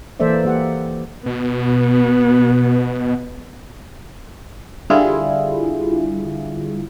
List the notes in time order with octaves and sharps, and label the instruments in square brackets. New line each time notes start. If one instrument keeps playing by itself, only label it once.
[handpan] E3 A#3 A4 C5 D5 E5
A#3 G4 F#5
[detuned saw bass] B2 [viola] B3
[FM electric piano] D3 G3 E4 F4 G#4